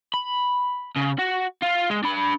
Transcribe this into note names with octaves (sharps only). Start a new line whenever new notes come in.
B5
C#3
F#4
F4
G#3
D4 B5